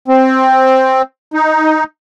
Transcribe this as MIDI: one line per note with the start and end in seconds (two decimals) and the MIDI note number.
0.08 1.02 60
1.34 1.84 63